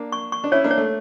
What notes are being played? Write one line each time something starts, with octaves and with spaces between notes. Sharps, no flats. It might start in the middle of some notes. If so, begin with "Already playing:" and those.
Already playing: A#3 D4
C#6
C#6
D4
C#4 E4 C#5
A#3 D4
C#5
A3